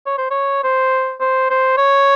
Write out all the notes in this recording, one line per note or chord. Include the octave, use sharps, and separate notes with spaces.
C#5
C5
C#5
C5
C5
C5
C#5